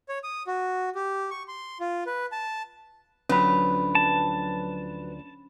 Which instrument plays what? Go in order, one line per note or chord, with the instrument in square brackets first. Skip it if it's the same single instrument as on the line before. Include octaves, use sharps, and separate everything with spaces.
[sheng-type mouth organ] C#5
D#6
F#4
G4
C#6
C6
F4
B4
A5
[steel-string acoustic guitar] D2 F3 D4 [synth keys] F#3 B4 [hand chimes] C#4 B5
[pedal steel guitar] A5